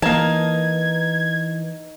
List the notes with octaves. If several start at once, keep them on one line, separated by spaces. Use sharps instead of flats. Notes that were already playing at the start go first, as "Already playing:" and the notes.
E3 A#3 D#4 A5 G#6